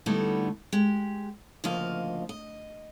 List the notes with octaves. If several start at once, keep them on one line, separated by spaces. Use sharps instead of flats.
D3 G3 A3 B3 D#4 E4
G#3 G4
D2 C#3 F3 A#3 D#5 F5
D#5